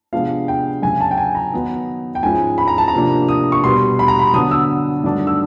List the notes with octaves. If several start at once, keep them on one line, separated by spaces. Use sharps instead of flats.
C3 F3 G#3 B3 D4 F5
G5
F#2 C#3 F#3 G#5
A5
G5
G#5
A#5
D#3 F#3 B3 D#4
G5
G#2 F3 G#3 C#4 E4 G#5
B5
A#5
A5
A#5
C3 F3 A#3 D4
D#6
C#6
B2 G3 B3 C6
B5
A#5
B5
D3 F#3 B3 D4 D#6
E6
G2 D#3 F#3 A3 D4
E6